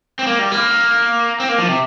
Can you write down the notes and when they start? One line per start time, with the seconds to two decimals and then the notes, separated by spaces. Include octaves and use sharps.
0.19 C4
0.27 A#3
0.39 G3
0.52 A#3
1.40 C4
1.49 A#3
1.58 F3
1.68 C3